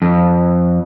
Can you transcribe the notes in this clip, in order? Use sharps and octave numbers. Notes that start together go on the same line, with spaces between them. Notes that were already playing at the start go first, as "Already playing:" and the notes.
F2